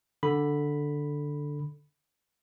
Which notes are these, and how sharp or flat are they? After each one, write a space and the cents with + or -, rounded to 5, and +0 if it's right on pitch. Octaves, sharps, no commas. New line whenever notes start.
D3 +0 B5 +0